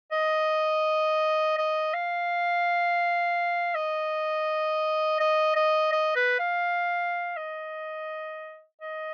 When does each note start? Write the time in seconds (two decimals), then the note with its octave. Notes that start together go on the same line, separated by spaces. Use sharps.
0.12 D#5
1.58 D#5
1.94 F5
3.75 D#5
5.20 D#5
5.56 D#5
5.92 D#5
6.16 B4
6.39 F5
7.37 D#5
8.82 D#5